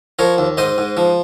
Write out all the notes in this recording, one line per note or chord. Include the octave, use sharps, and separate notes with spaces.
F3 A#4 C#5
D#2
G#2 C5 D#5
G#2
F3